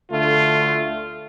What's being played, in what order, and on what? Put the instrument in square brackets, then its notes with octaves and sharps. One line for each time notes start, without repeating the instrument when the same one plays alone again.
[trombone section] D2 D3 A3 [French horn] F4